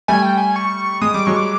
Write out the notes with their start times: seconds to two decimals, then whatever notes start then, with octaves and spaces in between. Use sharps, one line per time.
0.08 G3 A3 G#5
0.22 G5
0.37 G#5
0.56 C#6
1.02 G#3 D#6
1.14 G3 D6
1.26 F#3 G#3 C#6
1.37 D6